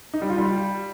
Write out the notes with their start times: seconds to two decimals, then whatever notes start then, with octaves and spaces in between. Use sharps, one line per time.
0.14 D#4
0.22 G3
0.30 F4
0.38 G3